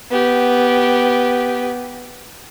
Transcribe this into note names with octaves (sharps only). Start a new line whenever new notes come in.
B3 G4